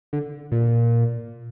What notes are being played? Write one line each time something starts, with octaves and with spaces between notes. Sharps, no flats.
D3
A#2